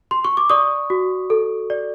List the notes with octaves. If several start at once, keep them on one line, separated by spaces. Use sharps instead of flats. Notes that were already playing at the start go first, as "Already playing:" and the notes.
C6
C#6
D6
D5 C#6 D#6
F#4
A4
D5